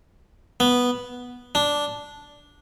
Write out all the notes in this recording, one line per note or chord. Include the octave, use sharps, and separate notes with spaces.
B3
D4